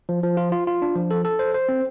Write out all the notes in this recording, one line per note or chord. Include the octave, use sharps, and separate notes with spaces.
F3
F3
F4
F4
F4
D4
F3
A4
A4
C5
C5
C4